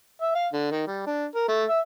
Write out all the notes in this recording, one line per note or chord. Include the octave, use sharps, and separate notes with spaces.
E5
F5
D3
D#3
G3
D4
A#4
A3
E5